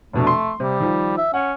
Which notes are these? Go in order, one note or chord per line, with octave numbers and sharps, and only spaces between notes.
F1 B2 A3 D4
C6
C3 G3
D#3 F3
E5
C#4 F#5